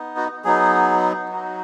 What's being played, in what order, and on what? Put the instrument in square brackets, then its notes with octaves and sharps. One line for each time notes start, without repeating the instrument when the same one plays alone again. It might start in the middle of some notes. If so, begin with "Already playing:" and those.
Already playing: [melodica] B3 D#4
F#4
F#3 B3 D#4 G#4
F#3 D#4 F#4